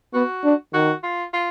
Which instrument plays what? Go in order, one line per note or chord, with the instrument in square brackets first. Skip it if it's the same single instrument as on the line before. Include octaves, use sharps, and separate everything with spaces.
[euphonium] B3 [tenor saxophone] F#4
[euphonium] D4
[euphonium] D#3 [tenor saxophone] F#4
[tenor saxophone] F4
F4